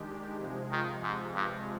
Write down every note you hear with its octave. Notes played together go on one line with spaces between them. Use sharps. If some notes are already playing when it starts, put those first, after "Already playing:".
Already playing: D#3 G#3 D4 G4
C3 F3 G#3
D#3
G#2
G2